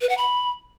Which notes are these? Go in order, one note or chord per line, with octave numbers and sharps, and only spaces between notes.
B4
F#5
B5